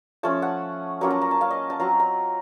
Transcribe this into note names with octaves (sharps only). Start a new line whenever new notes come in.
F3 A3 C#4 A5
F#5
F#3 A#3 C#4 F4 A#5
A5
A#5
A5
F5
D#5
A5
F#3 C4 F4 A#5
A#5